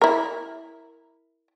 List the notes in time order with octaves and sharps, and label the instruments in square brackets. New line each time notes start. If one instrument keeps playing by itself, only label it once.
[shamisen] E4 A#4